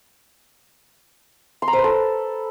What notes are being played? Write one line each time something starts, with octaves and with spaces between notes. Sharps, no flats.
C6
A#5
C5
B4
A4